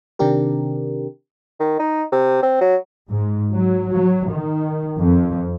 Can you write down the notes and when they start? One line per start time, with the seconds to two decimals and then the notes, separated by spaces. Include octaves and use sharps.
0.19 C3 D#3 C4 D4 G4 A#4
1.60 D#3
1.79 D#4
2.12 C3
2.43 C4
2.61 F#3
3.10 G#2
3.52 F#3
3.89 F#3
4.29 D#3
5.00 F2